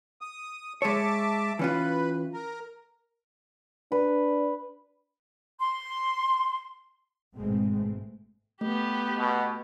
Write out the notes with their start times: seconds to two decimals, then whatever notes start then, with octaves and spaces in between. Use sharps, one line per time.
0.21 D#6
0.82 G#3 C#5 E5 A5 D6
1.59 E3 C#4 F4 B4
2.34 A#4
3.92 D4 B4
5.60 C6
7.36 G#1 G#2 B2 G#3 A3 C4
8.61 A3 B3 G4
9.19 B2